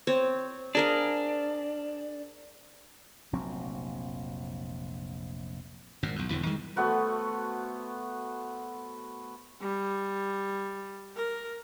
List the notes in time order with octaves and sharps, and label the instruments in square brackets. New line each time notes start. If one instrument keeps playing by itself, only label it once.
[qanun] C4 C#5
[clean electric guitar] D4 [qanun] G#4 A#4 F5
[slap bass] F1 A#1 F#3 C4
G#1 F#2 A#2
B1 E2
E1 E2 D3 E3
D#3 G3 G#3
[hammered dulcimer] A3 B3 F#4 C5
[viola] G3
A#4